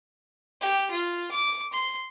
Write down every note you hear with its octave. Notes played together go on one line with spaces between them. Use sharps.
G4
F4
D6
C6